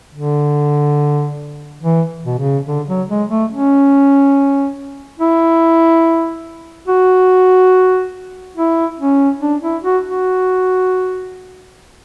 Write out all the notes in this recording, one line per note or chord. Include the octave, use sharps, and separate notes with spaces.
D3
E3
B2
C#3
D3
F#3
G#3
A3
C#4
E4
F#4
E4
C#4
D4
E4
F#4
F#4